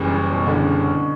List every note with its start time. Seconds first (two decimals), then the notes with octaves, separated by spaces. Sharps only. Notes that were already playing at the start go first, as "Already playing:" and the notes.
Already playing: F#1 F#2 C#3 E3 G3
0.11 C#3
0.32 B2
0.47 D3
0.54 C#3